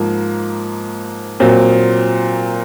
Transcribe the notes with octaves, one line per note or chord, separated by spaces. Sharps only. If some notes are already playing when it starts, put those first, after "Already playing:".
Already playing: G#2 F3 A#3
A#2 F#3 C4